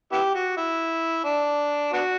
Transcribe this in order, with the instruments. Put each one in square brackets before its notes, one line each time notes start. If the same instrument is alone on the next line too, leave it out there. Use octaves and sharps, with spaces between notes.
[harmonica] B3 E4 G4
F#4
E4
D4
B3 D4 F#4